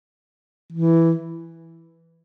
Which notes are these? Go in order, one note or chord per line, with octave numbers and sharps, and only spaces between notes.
E3